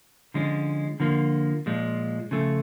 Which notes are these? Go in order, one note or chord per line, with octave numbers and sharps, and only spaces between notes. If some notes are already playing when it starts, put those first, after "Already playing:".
D3 F3 G#3 C#4
D3 F3 A#3
A#2 F3 G#3
C#3 F3 A3